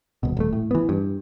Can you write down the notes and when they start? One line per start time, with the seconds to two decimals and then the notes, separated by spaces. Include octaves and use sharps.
0.23 D#1 B2
0.37 D#1 A3
0.53 A2
0.71 E3 B3
0.89 G2